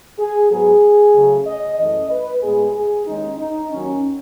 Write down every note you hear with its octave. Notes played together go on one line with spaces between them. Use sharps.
G#4
G#2 F#3 B3 G#4
C#3 F#3 A3 C#4
D#5
F#2 E3 A3 C#4 D#5
B4
A2 G#3 B3 G#4
G#4
D#2 D#3 G#3 C#4 D#4
D#4
D#2 D#3 F#3 C#4